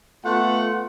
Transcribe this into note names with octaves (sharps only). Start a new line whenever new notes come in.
A3 B3 F4 F#5